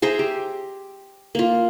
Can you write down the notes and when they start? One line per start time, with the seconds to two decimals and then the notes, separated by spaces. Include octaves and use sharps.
0.02 G#4 C5 E5 A#5
0.19 G4
1.35 A#3 F4